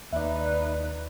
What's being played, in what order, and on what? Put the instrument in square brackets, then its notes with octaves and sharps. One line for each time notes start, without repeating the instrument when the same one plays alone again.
[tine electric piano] D#2 [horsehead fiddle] D#4 B4 [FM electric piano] D5 E5